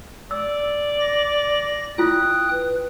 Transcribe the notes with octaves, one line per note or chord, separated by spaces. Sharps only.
D5 E6
A#6
E4 F4 G5 D#6 F#6
B4